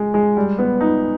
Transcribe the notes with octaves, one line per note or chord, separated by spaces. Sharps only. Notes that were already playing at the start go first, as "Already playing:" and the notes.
Already playing: G#3
G#3
G3
B3
D#4